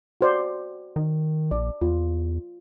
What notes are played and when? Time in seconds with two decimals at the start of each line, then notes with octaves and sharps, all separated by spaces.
0.21 F#4 C5 D5
0.96 D#3
1.51 A#1 D5
1.81 E2 F4